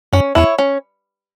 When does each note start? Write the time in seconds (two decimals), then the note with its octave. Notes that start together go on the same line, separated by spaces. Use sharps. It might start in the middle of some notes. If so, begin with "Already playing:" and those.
0.13 F#2 C#4
0.35 E2 E4 C#5
0.58 C#4